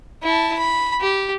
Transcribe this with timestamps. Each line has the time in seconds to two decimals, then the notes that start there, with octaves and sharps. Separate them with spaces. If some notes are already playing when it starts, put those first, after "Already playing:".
0.23 E4 A5
0.58 B5
1.01 G4